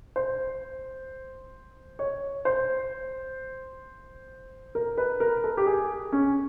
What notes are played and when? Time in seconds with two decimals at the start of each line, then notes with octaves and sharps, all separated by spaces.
0.16 C5
1.99 C#5
2.45 C5
4.75 A#4
4.98 B4
5.20 A#4
5.44 A4
5.57 G4
5.66 G#4
6.12 C#4